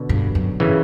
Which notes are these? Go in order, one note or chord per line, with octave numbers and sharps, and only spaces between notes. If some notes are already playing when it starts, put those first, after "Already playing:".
Already playing: B2 D3
G2
F#2
C#3 E3